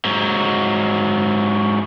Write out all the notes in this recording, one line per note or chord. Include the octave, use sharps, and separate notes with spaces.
G#2 F#3